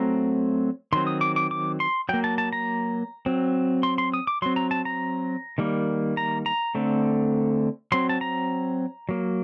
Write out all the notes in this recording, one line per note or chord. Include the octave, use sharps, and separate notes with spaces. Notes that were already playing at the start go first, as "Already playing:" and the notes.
Already playing: F#3 A3 C4 A#5
D#3 F#3 C4 C6
D#6
D6
D6
D6
C6
F#3 A#3 G5
A5
A5
A#5
F#3 C4
C6
C6
D#6
D6
F#3 C4 C6
A#5
A5
A#5
D#3 G3 A#3
A#5
A#5
D3 A3 C4
F#3 C4 C6
A5
A#5
F#3 A#3